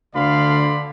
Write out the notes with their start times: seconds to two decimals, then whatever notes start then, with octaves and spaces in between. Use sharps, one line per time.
0.15 D2 D3 D5 F5 B5 C6